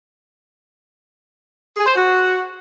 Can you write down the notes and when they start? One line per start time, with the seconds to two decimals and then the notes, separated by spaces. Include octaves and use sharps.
1.77 G#4
1.86 C5
1.96 F#4